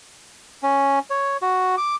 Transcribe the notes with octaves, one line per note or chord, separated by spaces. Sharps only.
C#4
C#5
F#4
D6